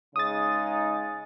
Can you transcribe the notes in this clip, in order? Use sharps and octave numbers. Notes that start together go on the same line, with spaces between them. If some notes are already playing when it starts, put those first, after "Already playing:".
C#3 G#3 D#4 D#6 A6